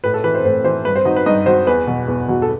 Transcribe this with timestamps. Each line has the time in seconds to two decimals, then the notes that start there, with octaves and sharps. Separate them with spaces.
0.04 A2 B4
0.14 A4
0.24 E3 B4
0.34 C4 C5
0.44 A2 C4 C5
0.64 E3 C4 C5
0.85 G2 B4
0.95 C4 C5
1.05 F#3 D#4 D#5
1.16 B4
1.26 G2 D#4 D#5
1.46 F#3 C4 C5
1.67 E2 B4
1.87 B2 F#3
2.08 E2
2.28 B2 F#3
2.42 A4